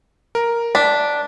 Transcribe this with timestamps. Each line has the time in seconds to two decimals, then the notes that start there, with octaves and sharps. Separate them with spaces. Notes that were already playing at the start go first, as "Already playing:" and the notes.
0.35 A#4
0.75 D4 B6